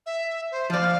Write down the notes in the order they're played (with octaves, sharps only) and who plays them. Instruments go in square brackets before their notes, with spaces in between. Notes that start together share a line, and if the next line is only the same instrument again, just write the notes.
[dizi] E5
C5
[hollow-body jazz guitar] F3 D5 [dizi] F5